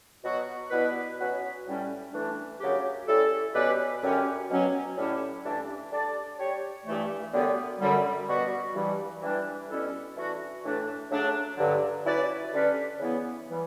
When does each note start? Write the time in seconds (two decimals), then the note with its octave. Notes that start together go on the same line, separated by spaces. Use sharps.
0.24 B2 F#3 B3 F#4
0.71 B2 G3 B3 E4 B4
1.19 B2 F#3 C#4 F#4 B4
1.66 A2 G3 C#4
2.13 E3 A3 D4
2.60 F#2 C#3 F#3 C#4 G4
3.07 G3 C#4 E4 A4
3.55 B2 G3 C#4 G4 B4
4.02 F#2 D3 G3 C#4 G4
4.49 B2 F#3 C#4
4.96 A2 G3 C#4 E4 G4
5.43 G2 E3 A3 D4
5.90 G3 D4 A4 D5
6.39 G3 D4 G4 C#5
6.85 G2 E3 A3
7.32 F#2 D3 G3 B3
7.80 F#2 D3 G3
8.27 B2 G3 B3 F#4
8.74 G2 E3 G3
9.22 E3 G3 D4
9.68 B2 G3 C#4 E4 A4
10.16 E3 A3 D4 F#4
10.63 A2 E3 A3 D4
11.10 C#3 F#3 A3 D4
11.57 G2 D3 F#3
12.04 F#3 C#4 E4 B4 D5
12.52 D3 G3 C#4 G4 B4
12.99 C#3 E3 B3 E4
13.49 E3 G3